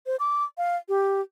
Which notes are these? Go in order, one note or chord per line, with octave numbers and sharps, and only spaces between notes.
C5
D6
F5
G4